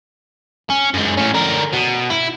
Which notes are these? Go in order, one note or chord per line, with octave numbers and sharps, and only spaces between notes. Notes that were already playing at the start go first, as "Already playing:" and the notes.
C#4
F#2 G#3
A2 C#4
D3 A#4
B2
E4